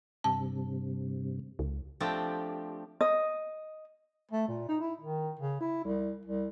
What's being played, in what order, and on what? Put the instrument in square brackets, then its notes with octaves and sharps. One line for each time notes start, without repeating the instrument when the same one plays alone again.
[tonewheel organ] G2 C3 [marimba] A5
[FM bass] C#2
[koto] F3 A3 C4 D4 G4
[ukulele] D#5
[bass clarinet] A3
A#2
D#4
E4
D#3
C#3
E4
C2
C2